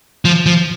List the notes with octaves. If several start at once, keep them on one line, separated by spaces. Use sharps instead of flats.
F3
F3